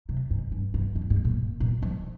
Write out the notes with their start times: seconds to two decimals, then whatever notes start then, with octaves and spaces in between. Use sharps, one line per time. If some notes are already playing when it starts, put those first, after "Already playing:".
0.09 C3
0.30 G#2
0.52 G2
0.74 G2
0.95 F2
1.10 G#2
1.25 A#2
1.60 A#2
1.82 F3